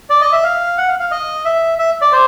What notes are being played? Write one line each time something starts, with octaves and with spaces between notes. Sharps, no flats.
D5
D#5
E5
F5
F#5
F5
F5
D#5
E5
E5
D5
C5